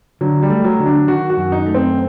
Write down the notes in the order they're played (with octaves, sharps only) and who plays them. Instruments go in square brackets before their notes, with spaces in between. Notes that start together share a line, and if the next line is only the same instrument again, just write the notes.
[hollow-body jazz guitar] D3 [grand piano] F#3
[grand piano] G3
[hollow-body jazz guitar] A3
[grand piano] F#3
[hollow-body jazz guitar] D3
[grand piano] D4
[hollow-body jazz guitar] D#3 [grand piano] F#4
[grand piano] F#4
[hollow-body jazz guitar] F#2
[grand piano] D#4
[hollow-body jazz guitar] A3
[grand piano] C4